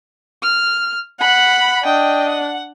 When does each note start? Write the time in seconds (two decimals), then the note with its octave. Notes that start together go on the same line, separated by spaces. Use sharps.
0.42 F6
1.20 F#5 B5
1.84 D4 D#5 G5
2.29 F#5